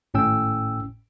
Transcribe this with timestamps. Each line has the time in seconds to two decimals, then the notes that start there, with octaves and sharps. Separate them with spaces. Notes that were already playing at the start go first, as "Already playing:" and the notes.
0.14 G#1 A2 C#4 G5 E6